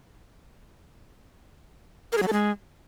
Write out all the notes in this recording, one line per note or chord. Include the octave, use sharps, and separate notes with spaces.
A#4
G#4
F#3
A4
G#3